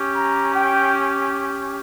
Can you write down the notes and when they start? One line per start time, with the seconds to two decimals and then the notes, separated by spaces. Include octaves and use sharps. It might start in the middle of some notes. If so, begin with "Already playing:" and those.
Already playing: C#4 G4
0.15 A#5
0.54 G5